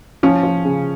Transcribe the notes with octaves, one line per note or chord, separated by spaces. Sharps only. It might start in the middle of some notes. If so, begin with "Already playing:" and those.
F3 C#4
F3
C#3